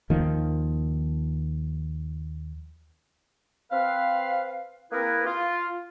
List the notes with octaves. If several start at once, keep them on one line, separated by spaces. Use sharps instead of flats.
D#2 D#3 F3 A#3
C4 B4 F5
A#3 C4 E4 G#4 A#4 B4
F4